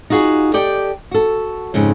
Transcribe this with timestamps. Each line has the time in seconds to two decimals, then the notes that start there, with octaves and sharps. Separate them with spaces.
0.10 D#4 F4 F#4 G#4
0.54 G4 A4 D5 D#5 G5
1.11 F#4 A4
1.74 F2 G#2 C#3